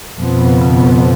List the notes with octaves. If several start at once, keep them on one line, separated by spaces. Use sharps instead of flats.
F2 B2 F3 B3
B2
C#3
C#3
B2